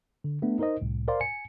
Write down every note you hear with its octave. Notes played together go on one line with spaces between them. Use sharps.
D3
A3 B3 D4
D#4 A#4 C5 D#5
C2 A2
A#4 C5 D5 F5 C6
G#5 C#7